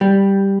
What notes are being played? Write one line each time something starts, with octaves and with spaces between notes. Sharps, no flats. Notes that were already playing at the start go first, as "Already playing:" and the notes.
G3